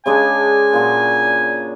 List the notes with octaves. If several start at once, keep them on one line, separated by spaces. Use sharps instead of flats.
C#3 G#3 D4 G#5
A#2 F4 F#4